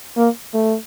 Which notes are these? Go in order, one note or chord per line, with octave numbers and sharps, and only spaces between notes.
A#3
A3